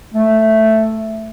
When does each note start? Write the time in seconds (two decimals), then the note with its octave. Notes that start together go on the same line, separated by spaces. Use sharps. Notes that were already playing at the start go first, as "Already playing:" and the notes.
0.14 A3